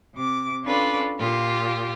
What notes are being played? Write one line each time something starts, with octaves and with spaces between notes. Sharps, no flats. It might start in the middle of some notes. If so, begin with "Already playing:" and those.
C3 D6
C#4 D4 F4 A4 B4 D5
A#2 F4 G4